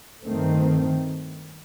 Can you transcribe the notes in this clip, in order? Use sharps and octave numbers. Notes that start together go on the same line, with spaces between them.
G2 D#3 A3 C4